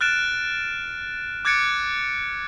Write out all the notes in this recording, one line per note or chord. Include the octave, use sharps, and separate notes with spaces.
F6 F#6 A6 D7 E7
D6 F#6 G#6 A6 C#7 D7